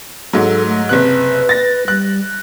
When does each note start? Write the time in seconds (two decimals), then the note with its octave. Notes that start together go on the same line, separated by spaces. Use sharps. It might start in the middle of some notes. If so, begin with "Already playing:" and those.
0.33 G#2 F#3 A4
0.66 A3
0.89 F#1 C3 B4 F#6
1.49 A6 A#6
1.88 G3 F#6